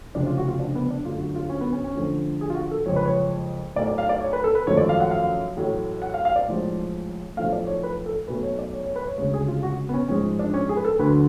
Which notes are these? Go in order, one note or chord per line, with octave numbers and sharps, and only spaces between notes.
F1 F2 C#3 F3 D4
F4
F#4
F4
D4
B3
D4
F#2 D3 F#3 A3 F4
F#4
F4
C#4
B3
C#4
C#4
F2 D3 F3 A3
G#4
F4
F#4
A4
F#1 F2 F3 G#3 C#5
B4
C#5
B1 A2 F#3 A3 D5
D5
F5
D5
C#5
B4
A4
B4
G#1 F#2 F3 A3 C#5
D5
F5
F#5
F5
A1 A2 F#3 A3
F#5
F5
F5
D5
B1 A2 F3 G#3
B1 A2 F3 A3 F5
D5
C#5
B4
A4
B1 B2 F#3 A3 B4
C#5
D5
C#5
C#5
B4
C#5
D2 C#3 G#3 C#5
G#4
F4
F#4
B3
C#4
A1 G#2 F3 G#3 C#4
D4
C#4
G#4
B4
A4
D2 D3 F#3 B4